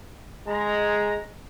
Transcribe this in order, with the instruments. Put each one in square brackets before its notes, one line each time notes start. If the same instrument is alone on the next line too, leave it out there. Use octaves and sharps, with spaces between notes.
[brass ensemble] G#3 A#5